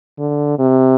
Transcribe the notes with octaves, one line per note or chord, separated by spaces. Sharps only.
D3
C3